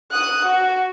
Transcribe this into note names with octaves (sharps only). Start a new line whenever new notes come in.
D#6 F#6
F#4